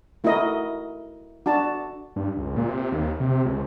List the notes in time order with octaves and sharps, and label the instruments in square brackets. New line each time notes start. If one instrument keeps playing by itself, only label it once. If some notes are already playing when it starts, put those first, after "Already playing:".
[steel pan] A3 E4 F#4 A#4 D#5
D4 F#4 A5
[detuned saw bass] G2
C#2
A#2
C3
D#2
C3
C#2